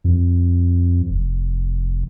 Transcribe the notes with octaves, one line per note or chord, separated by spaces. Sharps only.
F2
F1